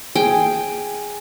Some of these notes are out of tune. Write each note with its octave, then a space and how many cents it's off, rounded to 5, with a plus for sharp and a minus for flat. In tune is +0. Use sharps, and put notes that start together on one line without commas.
G#4 +0 G5 +0